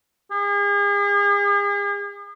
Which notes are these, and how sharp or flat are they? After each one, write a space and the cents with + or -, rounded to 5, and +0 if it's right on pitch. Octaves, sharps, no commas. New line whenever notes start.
G#4 -40